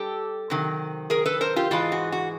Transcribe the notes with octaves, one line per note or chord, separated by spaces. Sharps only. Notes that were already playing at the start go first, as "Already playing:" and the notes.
Already playing: G3 G4 A4
C3 D#3 F#3
G#4 A#4
A4 B4
A#4 C5
F4 G4
G#2 E3 G#3 F4
F#4
F#4